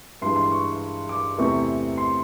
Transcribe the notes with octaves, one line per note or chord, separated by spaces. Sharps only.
G2 E3 G#3 C6
C6
C#6
D6
E2 C3 E3 A3 C4 C#6
C6